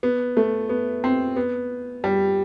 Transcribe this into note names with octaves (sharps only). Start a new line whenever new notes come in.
B3
A3
B3
C4
B3
G3